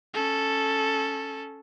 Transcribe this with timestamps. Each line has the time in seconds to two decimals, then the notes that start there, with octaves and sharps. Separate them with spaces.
0.14 C#4 A4